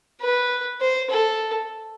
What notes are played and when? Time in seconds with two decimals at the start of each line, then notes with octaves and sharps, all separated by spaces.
0.21 B4
0.81 C5
1.10 A4